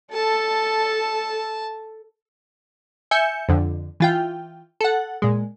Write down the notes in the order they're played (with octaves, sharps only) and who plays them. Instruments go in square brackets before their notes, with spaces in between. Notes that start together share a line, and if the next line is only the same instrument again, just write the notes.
[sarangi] A4 [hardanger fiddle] A5
[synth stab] E5 G#5 G6 C#7
F2 D3
E3 F4 G5
A4 F#5
A#2 G#3